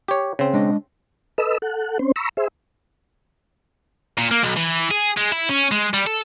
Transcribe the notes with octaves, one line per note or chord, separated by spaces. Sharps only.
G4 C#5
C#3 C4
G#3 D4 D#5
A4 B4 D#5 E6
A4 F#5
C4 C#4 C5
A#5 B5 C#6 E6
G#4 C5 E5
A#2
A#3
B1
E3
G#4
G#3
E4
C#4
G#3
G3
A4